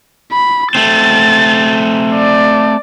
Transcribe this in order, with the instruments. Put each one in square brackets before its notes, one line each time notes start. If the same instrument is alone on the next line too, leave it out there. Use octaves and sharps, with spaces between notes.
[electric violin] B5
[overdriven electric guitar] A3 C4 [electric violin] A6
[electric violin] D5